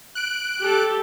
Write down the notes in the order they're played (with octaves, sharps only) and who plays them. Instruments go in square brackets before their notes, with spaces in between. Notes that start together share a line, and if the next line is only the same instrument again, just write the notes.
[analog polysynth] F#6 D7
[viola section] G4 A4